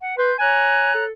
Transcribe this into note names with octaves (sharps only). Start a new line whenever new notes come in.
F#5
B4 C6 G6
C#5 G#5 A#5 F#6
A4